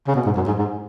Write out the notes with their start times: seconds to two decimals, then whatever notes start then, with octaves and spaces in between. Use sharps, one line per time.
0.08 C#3
0.15 B2
0.26 G#2
0.37 F#2
0.48 G#2
0.58 G#2